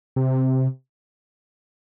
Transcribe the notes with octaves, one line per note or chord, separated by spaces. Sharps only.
C3